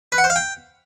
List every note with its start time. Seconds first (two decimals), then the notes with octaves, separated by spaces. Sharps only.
0.12 B4
0.18 F#5
0.24 C5
0.30 F5
0.36 G5